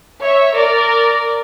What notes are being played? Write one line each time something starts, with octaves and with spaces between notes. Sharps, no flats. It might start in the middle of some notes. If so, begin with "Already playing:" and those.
C#5 E5
A#4 D5